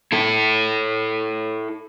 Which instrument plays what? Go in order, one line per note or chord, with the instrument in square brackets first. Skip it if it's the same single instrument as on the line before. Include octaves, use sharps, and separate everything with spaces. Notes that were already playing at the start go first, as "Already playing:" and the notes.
[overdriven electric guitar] E4 A4